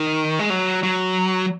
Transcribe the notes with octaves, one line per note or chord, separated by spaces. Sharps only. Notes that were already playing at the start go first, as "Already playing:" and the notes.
Already playing: D#3
G#3
F#3
F#3